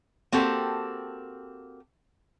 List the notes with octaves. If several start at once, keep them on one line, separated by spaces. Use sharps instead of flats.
A#3 C4 F#4 G4 A4